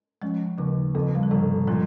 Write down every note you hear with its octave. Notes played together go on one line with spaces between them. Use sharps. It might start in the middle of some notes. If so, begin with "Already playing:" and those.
F3 G#3 C#4
D#2 C#3 F3
F2 C#3
G3
F3
G1 C3 D#3
A#2 F3 G#3